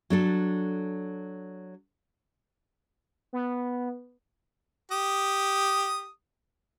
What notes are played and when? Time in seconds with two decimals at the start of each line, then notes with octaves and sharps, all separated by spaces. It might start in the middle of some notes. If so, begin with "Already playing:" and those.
0.10 F#3 D4 A4
3.33 B3
4.92 G4 D#6